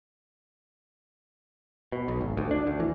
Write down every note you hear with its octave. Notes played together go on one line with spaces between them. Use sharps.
B2
B1
G#1
D2
D4
D2
E3